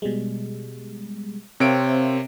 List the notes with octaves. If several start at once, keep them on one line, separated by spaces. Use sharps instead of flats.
B2 G3 G#3
C3 C4 A#4 C#5 E5 F5 D7